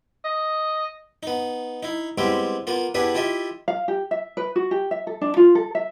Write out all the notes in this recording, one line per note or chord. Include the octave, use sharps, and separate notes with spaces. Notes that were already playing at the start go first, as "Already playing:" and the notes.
D#5
B3 D#4
D#4 E4
G3 G#3 B3 C4 E4 G4
A#3 B3 F4
B3 D4 E4 G4 G#4 B4
E4 F4 G4 D#5 E5
F5
G4
E5
B4
F#4
G4
E5
A4
D4
F4
A4
E5